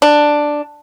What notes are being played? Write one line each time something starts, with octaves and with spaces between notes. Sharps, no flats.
D4